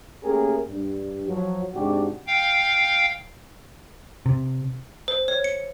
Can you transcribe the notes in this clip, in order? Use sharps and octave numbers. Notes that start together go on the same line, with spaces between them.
A3 A#3 C#4 G4 G#4 A#4
G2
F3 F#3
G#2 C3 D4 F#4 G4
F5 G5
C3
C5
C#5
C#7